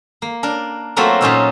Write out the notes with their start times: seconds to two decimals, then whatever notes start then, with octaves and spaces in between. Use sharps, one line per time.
0.22 A#3
0.43 D4 A#4
0.96 F#3 A3 A#3 C4 F4 F#4
1.21 A#2 F#3 C#4 D#4 F4 E5